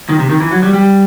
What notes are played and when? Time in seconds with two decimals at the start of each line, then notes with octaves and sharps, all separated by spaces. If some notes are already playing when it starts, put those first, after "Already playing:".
0.09 D#3
0.19 C3
0.29 D#3
0.40 E3
0.51 F#3
0.63 G3
0.73 G3